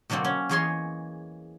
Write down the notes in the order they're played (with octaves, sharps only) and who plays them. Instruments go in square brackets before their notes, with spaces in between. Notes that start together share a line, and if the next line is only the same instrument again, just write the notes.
[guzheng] B2 D3 F#3 A#3 C4
C#4
E2 E3 G#4 C#5 D#5 C6